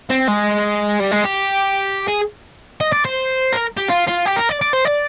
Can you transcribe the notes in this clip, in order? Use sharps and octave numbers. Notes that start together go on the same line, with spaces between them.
C4
G#3
G3
G#3
G4
G#4
D#5
D5
C5
A#4
G4
F4
F4
G4
A#4
D5
D5
C5
D5